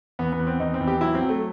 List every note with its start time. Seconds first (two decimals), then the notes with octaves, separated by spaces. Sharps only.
0.19 E2 B3
0.33 B3
0.40 E2
0.47 C4
0.60 E2 D#4
0.74 C4
0.80 E2
0.88 G4
1.01 F#3 E4
1.15 C4
1.22 F#3
1.29 A3